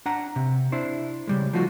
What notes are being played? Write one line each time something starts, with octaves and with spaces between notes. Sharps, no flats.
D4 F#5 A#5
C3
D4 E4 C5
C#3 G3 G#3
F3 A3 D#4 F4 F#4